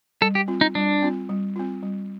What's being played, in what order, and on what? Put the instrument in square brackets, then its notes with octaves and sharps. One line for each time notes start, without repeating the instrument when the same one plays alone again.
[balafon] G3 [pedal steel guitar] A4
[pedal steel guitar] G4
[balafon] C4 F4
[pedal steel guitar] D#4
[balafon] G3 [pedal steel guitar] D4
[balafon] C4 F4
G3
C4 F4
G3